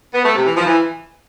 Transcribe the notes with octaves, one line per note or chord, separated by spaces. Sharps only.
B3
A3
C3
E3
F3
E3